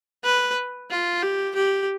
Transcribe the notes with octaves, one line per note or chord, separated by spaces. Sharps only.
B4
F4
G4
G4